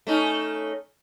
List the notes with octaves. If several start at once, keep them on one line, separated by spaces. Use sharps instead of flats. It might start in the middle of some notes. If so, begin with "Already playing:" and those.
A3 C#4 D#4